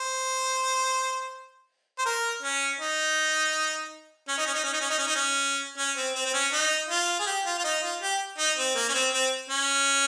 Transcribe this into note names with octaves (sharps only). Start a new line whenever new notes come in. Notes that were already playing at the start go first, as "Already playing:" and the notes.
Already playing: C5
C5
A#4
C#4
D#4
C#4
D#4
C#4
D#4
C#4
D#4
C#4
D#4
C#4
D#4
C#4
C#4
C4
C4
C4
C#4
D#4
F4
G#4
G4
F4
F4
D#4
F4
G4
D#4
C4
A#3
C#4
C4
C4
C#4